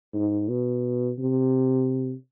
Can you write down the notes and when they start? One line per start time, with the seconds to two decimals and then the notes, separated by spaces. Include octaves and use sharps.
0.14 G#2
0.49 B2
1.19 C3